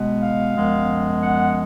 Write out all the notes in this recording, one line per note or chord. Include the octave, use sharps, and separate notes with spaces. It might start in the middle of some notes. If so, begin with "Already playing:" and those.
Already playing: B2 G#3 B3
F5
F#2 F3 G#3 B3
F#5